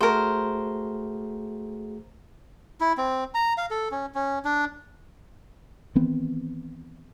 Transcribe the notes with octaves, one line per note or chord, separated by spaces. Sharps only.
A3 F#4 G#4 A#4 C5
E4
C4
A#5
F5
A4
C#4
C#4
D4
D#3 E3 B3 C4